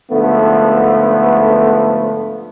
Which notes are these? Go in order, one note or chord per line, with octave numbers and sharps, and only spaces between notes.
G#2 D3 F3 A3 B3